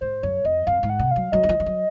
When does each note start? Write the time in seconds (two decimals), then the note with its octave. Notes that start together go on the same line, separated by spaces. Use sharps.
0.01 G#2 C5
0.23 F#2 C#5
0.45 F2 D#5
0.67 F2 F5
0.83 G#2
0.90 F#5
0.99 C3
1.11 F#3 F5
1.32 F#3 D#5
1.43 D#3
1.49 F3
1.60 F3
1.66 F#3